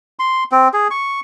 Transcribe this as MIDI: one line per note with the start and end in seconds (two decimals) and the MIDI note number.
0.19 0.44 84
0.52 0.68 60
0.73 0.88 68
0.91 1.20 85